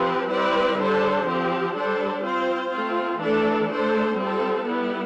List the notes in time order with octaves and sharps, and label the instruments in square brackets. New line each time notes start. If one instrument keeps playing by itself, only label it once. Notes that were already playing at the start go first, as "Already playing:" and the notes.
Already playing: [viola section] F3 C4 G4 B4
G3 C4 E4 B4 D5
D3 G3 D4 A4 C5
F3 C4 G4
G3 D4 A4 C5
C4 F4 C5
A3 C4 F4
E3 A3 D4 A4
A3 D4 A4 C5
G3 C4 F4 A4
G3 B3 E4